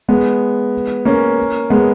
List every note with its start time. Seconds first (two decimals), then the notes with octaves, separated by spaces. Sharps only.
0.08 G#3 B3
1.05 A#3 C#4
1.70 G#3 B3